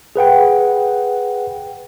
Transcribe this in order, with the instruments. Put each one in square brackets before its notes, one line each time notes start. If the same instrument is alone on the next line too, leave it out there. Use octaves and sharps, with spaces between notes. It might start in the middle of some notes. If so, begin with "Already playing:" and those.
[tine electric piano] G#4 B4 F#5 G5